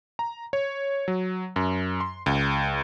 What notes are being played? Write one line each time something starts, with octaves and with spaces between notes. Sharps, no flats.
A#5
C#5
F#3
F#2
C6
C#2